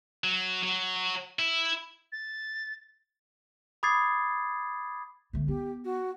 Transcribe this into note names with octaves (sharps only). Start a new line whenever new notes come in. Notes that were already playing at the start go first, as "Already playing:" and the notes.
F#3
F#3
E4
A6
B5 D6 D#6 G#6 A6 C7
D3 A3
B3 G4
F#4